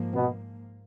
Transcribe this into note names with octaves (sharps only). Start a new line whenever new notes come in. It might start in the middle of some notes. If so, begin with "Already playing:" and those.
Already playing: G#2 F3 A#3
B2 B3